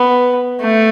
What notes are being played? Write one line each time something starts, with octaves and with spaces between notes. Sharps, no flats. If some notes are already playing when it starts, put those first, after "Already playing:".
Already playing: B3
A3